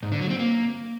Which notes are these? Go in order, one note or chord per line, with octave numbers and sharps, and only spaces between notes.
G#2
D3
F#3
C4
A#3